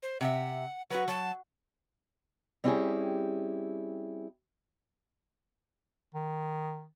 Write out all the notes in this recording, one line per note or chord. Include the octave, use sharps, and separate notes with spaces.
C5
C3 E5 F#5
F#3 F#4 B4
F#3 A5
G3 C4 C#4 E4 G4 G#4
D#3